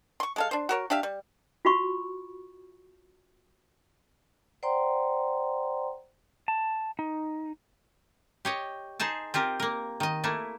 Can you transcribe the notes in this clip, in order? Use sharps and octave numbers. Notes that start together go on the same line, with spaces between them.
C6 C#6
G#3 A4 F5
D4 C5
F#4 A#4 C#5
D4 G4 E5 F5
G3
F4 F#4 B5 C#6
C5 D5 F#5 G5 A#5 C6
A5
D#4
G4 C#5 D#5
D#4 G#4 C5 A5
C4 F4 G4 A#4
A#3 A#4
D#3 D#5
A3 A#3 E4